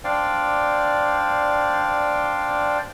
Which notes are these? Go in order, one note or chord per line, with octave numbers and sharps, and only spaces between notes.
D4 C5 D5 F5 G5